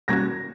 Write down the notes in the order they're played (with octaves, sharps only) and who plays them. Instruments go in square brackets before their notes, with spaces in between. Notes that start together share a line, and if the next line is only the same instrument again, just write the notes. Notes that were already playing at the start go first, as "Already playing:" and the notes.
[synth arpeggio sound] B2 G3 A#3 C#4 F#4 [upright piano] G#6 A#6